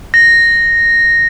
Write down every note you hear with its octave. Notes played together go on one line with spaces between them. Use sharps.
A#6